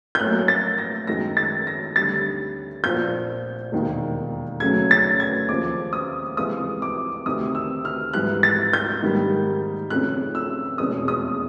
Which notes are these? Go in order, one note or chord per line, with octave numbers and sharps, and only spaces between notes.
G6
A1 A2 F#3 A#3 F#6
A6
A#6
F#2 D#3 G#3 A#6
A6
A#6
D2 D3 G3 A6
A#1 A#2 F3 G6
E1 D#2 D#3
D2 C#3 F#3 A3 C#4 G#6
A6
G#6
D#2 C#3 F3 D6
D#6
C#2 C3 E3 G#3 D#6
D6
D2 C3 D#3 D#6
E6
F6
G#2 E3 G3 F#6
A6
G6
G#2 D#3 G3 A#3
F1 F2 C#3 F#6
E6
F1 E2 B2 G#3 C#4 D#6
D#6